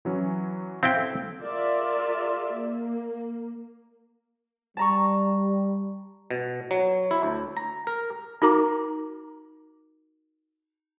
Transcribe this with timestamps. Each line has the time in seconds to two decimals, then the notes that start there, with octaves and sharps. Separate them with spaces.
0.05 E3 F#3 C#4
0.83 C4 E4 F5 G5
0.97 A4
1.40 F4 G#4 A#4 D5 E5
2.52 A#3
4.77 G3 A5 A#5 C#6
6.31 B2
6.71 F#3
7.11 E4
7.23 D2
7.57 A#5
7.87 A#4
8.42 D#4 F#4 A#4 A#5 D6